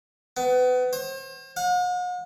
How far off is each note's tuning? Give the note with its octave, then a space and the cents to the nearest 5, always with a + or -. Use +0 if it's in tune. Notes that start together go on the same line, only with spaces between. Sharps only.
B3 +30
C5 +40
F#5 -45